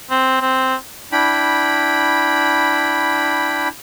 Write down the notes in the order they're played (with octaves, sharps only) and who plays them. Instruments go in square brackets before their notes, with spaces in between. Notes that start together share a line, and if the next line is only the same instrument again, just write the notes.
[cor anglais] C4
C4
[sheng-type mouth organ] D4 E4 G5 B5